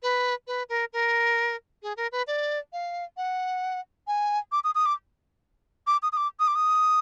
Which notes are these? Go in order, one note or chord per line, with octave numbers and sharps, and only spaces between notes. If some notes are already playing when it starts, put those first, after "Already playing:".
B4
B4
A#4
A#4
G#4
A#4
B4
D5
F5
F#5
G#5
D6
D#6
D#6
D6
D6
D#6
D#6
D6
D#6
D6
D#6